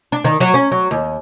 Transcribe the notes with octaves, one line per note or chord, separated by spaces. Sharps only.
D4
D#3
F#3
C#4
F#3
D#2